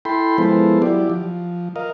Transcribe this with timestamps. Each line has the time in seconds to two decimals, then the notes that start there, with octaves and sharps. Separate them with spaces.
0.05 E4 A4 G5 B5 C6
0.38 F3 G#3 B3 E4 A4 C5
0.82 F#3 E4 G4 D5
1.10 F3
1.76 A#4 D#5 F5